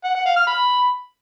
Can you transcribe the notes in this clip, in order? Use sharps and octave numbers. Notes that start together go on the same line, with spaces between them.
F#5
F#5
F5
F6
B5